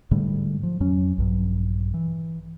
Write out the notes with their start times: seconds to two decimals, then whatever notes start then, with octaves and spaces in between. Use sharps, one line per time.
0.11 G#2 D3 G3 A3
0.63 F3
0.80 F2 F#3 C#4
1.18 A#1 G2 F#3
1.94 E3